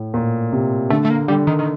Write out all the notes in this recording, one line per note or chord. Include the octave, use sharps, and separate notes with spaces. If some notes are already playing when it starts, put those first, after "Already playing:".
Already playing: A2
A#2
C3
D3 A3
A3
A#3
D3 G3
D#3
D#3